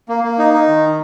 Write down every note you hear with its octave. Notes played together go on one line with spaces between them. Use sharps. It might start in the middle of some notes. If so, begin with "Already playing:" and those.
A#3
A#3
D#4
D#4
D#3